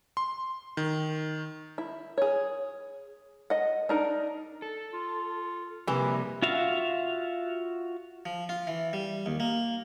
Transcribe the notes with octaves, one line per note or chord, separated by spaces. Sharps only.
C6
D#3
E4
G#4 C#5
D#5 F#5
D4 D#4 A#4
A4
F4
F2 C3 E3 G3 A#3 G#4
F4 F#4 E5 F5
F3
F4
E3
G3
D#2
A#3